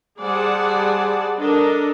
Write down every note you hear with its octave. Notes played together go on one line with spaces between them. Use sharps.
G3 G#4 C5 D5 F#5 A5
D4 A4 A#4 D#5